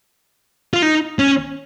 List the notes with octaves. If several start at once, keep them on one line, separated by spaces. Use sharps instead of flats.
F4
D#4
C#4